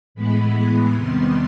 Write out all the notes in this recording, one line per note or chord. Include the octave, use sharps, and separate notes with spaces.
A2 E3 G#3 B3 B5
E2 C3 D#3 G3 B3 C6